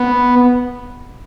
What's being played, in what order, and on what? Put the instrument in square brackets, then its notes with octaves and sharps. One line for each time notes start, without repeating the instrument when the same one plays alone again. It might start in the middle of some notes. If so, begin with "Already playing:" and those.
Already playing: [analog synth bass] B3